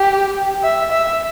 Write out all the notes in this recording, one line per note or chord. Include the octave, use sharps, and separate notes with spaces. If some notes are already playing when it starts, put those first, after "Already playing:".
Already playing: G4
E5
E5